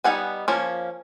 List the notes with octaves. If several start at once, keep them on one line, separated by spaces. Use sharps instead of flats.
G3 B3 D#4 F#5 G#5
F3 A#3 C#4